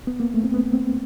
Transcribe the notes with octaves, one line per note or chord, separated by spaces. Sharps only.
B3
A#3
A3
C4
B3
C4